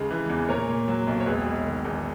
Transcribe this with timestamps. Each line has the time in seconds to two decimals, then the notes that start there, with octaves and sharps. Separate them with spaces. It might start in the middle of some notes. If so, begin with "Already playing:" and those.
Already playing: D#2 C#3 G#3
0.11 E3
0.30 E2
0.49 A#2 A#4 C#5
0.69 A#2
0.88 F#3
1.07 B1
1.20 C#5
1.26 E1 G#4 B4
1.46 E1
1.65 D#3
1.85 E2